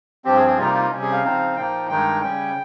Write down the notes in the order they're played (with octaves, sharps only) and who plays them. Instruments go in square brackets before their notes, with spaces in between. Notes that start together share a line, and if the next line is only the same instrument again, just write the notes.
[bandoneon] G2 F3 C4 G4
G#4
G#4
C3 G3 A#3 D#4 F4
F4
C3 G3 C#4
G#4
F5
C#3 F3 C4 D#4
A#2 F3 A#3 D#4 G5
G2 D#3 G#3 D#4 G5
C#3 G3 C#4 G5